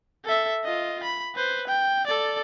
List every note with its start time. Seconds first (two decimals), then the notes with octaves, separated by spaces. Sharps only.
0.24 A4 E5
0.64 F4 D#5
1.03 B5
1.35 B4 C5
1.67 G5
2.07 A4 D5